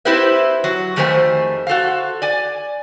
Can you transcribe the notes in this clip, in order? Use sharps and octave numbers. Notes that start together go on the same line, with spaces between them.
C4 E4 G4 B4 C5 E5
F#3
F2 D#3 A3 G4 C5 G#5
F#4 A4 C5 F5
D5 G#5